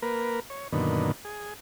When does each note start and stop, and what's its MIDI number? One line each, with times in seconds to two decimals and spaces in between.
0.02 0.40 58
0.02 0.40 70
0.02 0.40 71
0.50 0.68 73
0.72 1.12 42
0.72 1.12 46
0.72 1.12 50
0.72 1.12 51
0.72 1.12 59
1.25 1.54 68